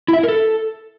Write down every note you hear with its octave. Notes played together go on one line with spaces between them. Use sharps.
E4
E5
E4
A#4
A4